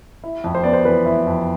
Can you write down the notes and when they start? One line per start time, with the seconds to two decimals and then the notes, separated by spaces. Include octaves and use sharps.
0.24 E4
0.44 F2
0.55 C5
0.64 B3 D5
0.73 C5
0.85 E3 B4
1.06 E4
1.27 F2